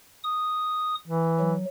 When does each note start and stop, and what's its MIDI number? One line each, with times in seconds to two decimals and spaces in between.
0.24 0.95 87
1.08 1.57 52
1.40 1.65 54